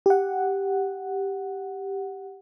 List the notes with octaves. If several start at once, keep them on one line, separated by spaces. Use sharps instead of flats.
G4 F#5